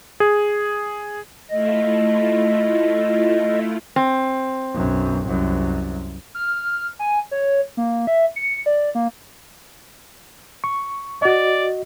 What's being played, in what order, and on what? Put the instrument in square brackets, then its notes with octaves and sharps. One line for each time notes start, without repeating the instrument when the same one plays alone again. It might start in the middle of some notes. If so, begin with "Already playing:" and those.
[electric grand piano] G#4
[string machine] A3 E4 F4 [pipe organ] D#5
[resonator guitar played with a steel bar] C4
[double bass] B1 F#2
C2 F#2
[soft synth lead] F6
G#5
C#5
A#3
E5
C#7
D5
A#3
[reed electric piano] C#6
[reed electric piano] F#4 D#5 [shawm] D5